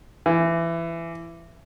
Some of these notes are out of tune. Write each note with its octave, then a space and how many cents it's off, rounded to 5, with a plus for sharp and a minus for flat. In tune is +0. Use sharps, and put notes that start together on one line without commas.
E3 +20